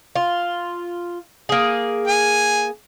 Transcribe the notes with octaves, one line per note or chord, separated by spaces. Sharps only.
F4
A#3 G#4
G#5